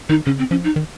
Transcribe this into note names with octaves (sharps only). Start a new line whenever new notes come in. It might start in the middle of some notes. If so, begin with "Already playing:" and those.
D#3 D#4
C#3 C#4
C4
F3 C#4
D#4
D#3